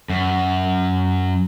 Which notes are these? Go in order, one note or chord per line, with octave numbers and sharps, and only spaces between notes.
F#2